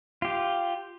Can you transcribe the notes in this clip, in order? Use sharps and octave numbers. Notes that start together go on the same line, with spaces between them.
F4 G4